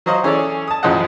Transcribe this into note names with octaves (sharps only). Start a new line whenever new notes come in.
F#3 F#4 C5 D#5 F5
E3 C#4 G#4 A4 C#5 D5
A5 D#6
A1 F#2 F3 G#4 D#5 F#5